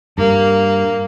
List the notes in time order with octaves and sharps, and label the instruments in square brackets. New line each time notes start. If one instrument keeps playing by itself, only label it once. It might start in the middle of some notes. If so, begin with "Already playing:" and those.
[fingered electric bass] G2 [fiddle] A#3